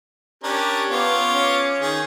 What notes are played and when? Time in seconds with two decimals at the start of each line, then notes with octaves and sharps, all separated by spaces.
0.44 C#4 D4 G4 A#4
0.91 B3 F4 C#5 D6
1.31 C#4
1.81 D#3 G#4